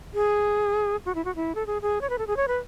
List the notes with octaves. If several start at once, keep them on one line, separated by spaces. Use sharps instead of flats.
G#4
F#4
E4
F#4
E4
A4
G#4
G#4
C#5
B4
A4
G#4
C#5
B4